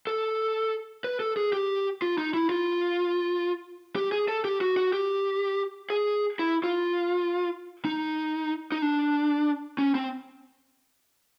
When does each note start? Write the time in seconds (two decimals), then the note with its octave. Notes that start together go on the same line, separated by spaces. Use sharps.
0.07 A4
1.04 B4
1.20 A4
1.37 G#4
1.53 G4
2.02 F4
2.18 D#4
2.34 E4
2.49 F4
3.96 G4
4.12 G#4
4.28 A4
4.45 G4
4.61 F#4
4.77 F#4
4.93 G4
5.90 G#4
6.39 E4
6.64 F4
7.85 D#4
8.72 D#4
8.82 D4
9.78 C#4
9.95 C4